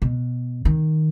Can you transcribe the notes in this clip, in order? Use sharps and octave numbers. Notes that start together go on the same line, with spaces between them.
B2
D#3